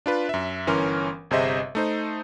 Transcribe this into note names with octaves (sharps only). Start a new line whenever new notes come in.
D4 F4 B4
F#2 E5
G1 E3 C#4 A#4 C6 F6
G1 C3 G#4 C5 D#5 E5
A3 D#4 C5